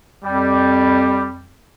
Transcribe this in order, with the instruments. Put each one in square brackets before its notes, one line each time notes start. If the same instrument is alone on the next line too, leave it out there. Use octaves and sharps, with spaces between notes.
[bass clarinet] F2 [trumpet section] G3